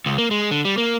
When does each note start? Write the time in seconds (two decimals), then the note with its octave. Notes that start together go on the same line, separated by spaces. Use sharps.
0.06 C#2
0.18 A#3
0.31 G#3
0.51 D3
0.65 G3
0.78 A#3